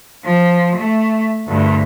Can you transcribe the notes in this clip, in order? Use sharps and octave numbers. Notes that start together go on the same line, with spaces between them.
F3
A3
D2 G2